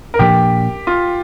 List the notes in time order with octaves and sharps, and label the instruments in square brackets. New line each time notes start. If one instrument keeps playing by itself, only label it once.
[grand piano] A#4
[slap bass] A#2 F3 A#3 D4 [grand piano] G4
[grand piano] F4